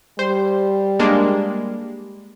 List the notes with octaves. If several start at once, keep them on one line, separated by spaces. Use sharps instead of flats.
G3 C5
G#3 A#3 D4